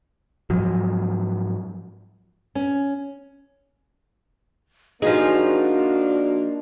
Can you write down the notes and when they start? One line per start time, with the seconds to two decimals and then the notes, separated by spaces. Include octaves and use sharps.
0.50 G#2 F3 F#3
2.55 C#4
5.02 F3 A#3 D4 D#4 F4 F#4 G#4